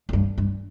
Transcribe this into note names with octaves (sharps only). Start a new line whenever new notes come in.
F2
G2
G2